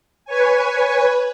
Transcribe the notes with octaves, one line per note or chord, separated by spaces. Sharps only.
B4 C#5 G#5